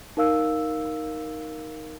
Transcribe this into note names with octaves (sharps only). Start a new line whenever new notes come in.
D#4 A#4 F5 E6